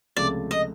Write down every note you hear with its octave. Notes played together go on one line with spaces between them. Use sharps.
C#2 C3 F3 A3 D5
D#5